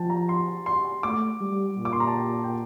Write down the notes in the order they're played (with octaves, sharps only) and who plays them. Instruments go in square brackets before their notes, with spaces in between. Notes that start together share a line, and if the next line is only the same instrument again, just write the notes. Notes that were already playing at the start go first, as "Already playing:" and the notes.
Already playing: [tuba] F3 [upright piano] G5 A5
[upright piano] A#5
C6
C6
[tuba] A3 [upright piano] D6
[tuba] G3
A#2
[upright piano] D6
C6
A#5
A5
G5
A5
G5